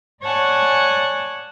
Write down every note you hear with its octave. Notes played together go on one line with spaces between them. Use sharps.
C#5 D5 F#5 G#5 A5